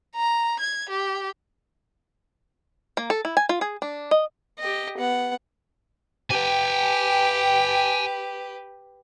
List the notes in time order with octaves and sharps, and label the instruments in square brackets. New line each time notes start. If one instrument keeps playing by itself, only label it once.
[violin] A#5
G#6
G4
[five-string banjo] A#3
A4
E4
G#5
F4
G#4
D4
D#5
[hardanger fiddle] G4 D#5
B3 F#5
[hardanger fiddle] G4 B4 [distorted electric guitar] G5 G#5